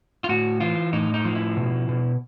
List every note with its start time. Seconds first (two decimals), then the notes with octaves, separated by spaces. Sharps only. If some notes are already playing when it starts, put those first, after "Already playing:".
0.24 F4
0.29 A2 F#4
0.60 E3 F4
0.93 A2 D#4
1.14 D#4
1.25 F3
1.35 E4
1.57 B2
1.89 B2